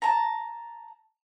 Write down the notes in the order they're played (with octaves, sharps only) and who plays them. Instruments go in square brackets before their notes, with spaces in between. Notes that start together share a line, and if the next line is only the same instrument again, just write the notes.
[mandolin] A5 A#5